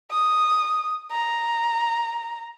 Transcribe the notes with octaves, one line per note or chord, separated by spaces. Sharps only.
D#6
A#5